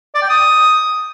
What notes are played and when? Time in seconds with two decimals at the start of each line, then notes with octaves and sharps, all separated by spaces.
0.15 D5
0.22 G5
0.29 D#6